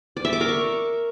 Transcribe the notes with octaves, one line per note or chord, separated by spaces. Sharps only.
D5
E5
D6
A#4
C#6